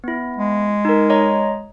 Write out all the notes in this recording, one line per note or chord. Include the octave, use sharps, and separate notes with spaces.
B3 E4
G#3
D#4 A#4
C#5 D#5 A#5